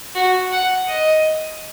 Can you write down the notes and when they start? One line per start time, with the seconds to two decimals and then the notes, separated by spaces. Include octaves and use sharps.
0.15 F#4
0.52 F#5
0.88 D#5